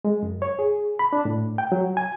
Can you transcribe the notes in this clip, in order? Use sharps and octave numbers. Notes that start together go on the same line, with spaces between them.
G#3
F#2
C#5
G#4
B5
D4
A2
G5
F#3
G#5